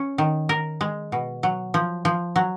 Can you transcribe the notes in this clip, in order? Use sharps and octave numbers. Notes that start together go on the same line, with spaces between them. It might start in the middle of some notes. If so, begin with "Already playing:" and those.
Already playing: C#4
D#3
A#4
G#3
B2
F#3
F3
F3
F#3